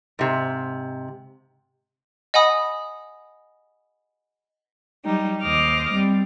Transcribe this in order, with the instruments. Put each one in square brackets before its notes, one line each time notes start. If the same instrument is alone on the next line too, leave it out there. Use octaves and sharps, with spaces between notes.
[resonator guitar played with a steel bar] G#2 C3
[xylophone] D#5 F#5 G#5 B5 D#6
[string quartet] F#3 G3 D#4 G4
D#2 C5 D#5 D6 F6
G3 C4